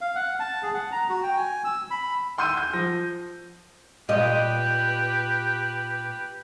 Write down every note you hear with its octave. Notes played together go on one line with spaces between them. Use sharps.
F5
F#5
A5
G#4
F#5
A#5
F#4
G5
G#5
E6
B5
F#5 C6 E6 G6 D#7
G6
F3 A#6
A#2 G4 B4 D#5